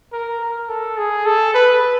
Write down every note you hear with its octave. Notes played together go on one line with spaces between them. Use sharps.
A#4
A#4
A4
G#4
A4
B4